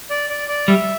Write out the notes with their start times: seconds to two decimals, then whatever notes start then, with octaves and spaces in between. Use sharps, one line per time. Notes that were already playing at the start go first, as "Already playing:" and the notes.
0.10 D5
0.30 D5
0.48 D5
0.68 G3 E5